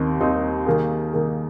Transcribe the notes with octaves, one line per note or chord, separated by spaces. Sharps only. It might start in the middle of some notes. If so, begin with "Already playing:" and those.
Already playing: D#2 D#3 C4 D#4
D#2 D#3 C4 D#4
D#3 A#3 G#4
D#3 A#3 G#4